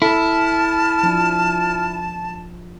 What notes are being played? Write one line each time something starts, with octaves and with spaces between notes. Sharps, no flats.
E4 A4 A5 F6
F3 D4